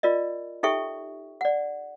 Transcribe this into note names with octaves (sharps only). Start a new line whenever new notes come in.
F4 A#4 D5 D#5
D#4 G4 A4 E5 G5 C#6
D5 F#5